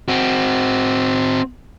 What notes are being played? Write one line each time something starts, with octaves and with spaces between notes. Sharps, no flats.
C4 F#4